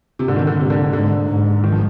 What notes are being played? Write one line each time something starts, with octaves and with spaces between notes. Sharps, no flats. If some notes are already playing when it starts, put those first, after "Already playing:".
C3
G#2 D3
D#3
D3
G#2 C3
D3
D3
G#2 D3
G#2
D#3
F3